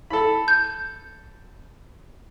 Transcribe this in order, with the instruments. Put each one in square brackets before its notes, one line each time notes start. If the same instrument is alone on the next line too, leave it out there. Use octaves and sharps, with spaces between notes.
[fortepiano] A4 B5
[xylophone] G6